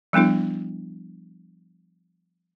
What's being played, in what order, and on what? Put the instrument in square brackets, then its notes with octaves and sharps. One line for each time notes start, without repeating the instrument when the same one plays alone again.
[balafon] F3 G3 B3 D4 E4